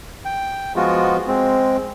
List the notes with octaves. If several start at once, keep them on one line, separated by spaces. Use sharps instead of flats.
G5
F3 G#3 B3 F4 F#4
G#3 C4